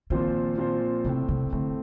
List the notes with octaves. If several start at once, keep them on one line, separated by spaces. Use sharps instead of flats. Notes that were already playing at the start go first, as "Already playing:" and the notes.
A#2 D#3 F3 C4 F4 C5
A#2 F3 C4 F4 C5
A2 C3 A3 C4
C3
A2 D3 A3 C4